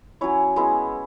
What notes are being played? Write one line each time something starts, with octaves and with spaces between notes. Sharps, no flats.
F#3 C#4 E4 C#5
G#3 B3 E4